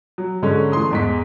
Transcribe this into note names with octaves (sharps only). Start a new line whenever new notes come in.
F#3
G#2 D3 G#3 C#4
E3 A3 C6 D#6
E2 G#2 B6